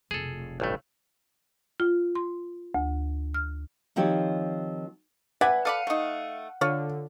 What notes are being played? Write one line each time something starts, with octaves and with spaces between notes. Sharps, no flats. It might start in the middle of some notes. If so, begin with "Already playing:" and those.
F1 B1 G#4 A4
A1 G2 A3
F4
C6
D2
F6
D#3 F3 C4 G4 C#5
B4 D5 E5 F#5 G#5
A4 D5 F5 B5 C#7 D#7
A3 D#4
D3 F4 C#5